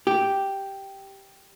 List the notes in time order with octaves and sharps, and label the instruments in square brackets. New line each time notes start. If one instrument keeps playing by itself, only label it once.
[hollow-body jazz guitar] G4